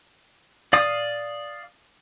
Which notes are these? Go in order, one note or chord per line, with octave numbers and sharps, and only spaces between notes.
D5 F5 D#6